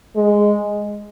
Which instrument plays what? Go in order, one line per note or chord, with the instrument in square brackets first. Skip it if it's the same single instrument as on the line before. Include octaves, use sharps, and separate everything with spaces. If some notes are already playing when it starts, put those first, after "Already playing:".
[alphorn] G#3